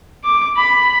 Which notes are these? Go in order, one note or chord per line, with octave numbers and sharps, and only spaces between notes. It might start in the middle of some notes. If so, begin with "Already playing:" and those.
D6
B5